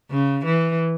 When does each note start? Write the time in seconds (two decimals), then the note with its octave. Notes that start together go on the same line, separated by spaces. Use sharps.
0.10 C#3
0.45 E3